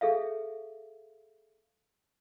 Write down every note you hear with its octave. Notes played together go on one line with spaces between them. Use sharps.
G#4 A4 E5 F5